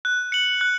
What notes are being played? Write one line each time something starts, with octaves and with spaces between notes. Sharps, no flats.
F#6
C#7 F#7
F#6